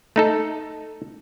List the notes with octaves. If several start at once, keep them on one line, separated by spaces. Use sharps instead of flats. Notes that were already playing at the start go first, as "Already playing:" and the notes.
A3 D#4 A4